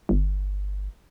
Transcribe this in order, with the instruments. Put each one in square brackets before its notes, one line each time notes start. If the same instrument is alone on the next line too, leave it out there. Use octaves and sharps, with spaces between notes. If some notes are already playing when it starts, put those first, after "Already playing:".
[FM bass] G1